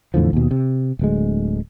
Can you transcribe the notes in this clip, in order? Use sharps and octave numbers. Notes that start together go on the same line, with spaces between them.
E2 A2 D3 F3
D#2 B2
C3
D1 D2 G#3